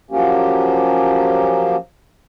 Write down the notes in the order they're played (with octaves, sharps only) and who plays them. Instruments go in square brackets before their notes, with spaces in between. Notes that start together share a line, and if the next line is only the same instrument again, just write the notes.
[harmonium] F3 F#3 A#3 C#4 G4